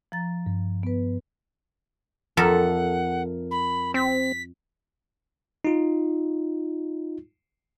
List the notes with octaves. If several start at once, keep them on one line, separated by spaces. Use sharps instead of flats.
F3 A#5 A6
G2
B3 B4
F2 A4 A#4 E5 F#5
B5
C4 B6
D#4 F4